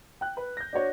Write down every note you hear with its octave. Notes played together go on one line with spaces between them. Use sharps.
G5 F#6
B4
G6 A#6
D4 F#4 C#5